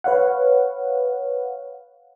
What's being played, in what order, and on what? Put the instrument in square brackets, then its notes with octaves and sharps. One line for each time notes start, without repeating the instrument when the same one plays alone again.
[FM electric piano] B4 C#5 F5 F#5